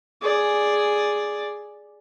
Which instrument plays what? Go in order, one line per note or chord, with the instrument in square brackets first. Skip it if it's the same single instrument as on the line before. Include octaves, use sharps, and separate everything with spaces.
[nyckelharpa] G#4 D5